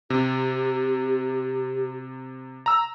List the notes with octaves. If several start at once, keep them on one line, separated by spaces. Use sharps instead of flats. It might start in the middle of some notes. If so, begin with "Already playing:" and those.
C3 G4
A#5 E6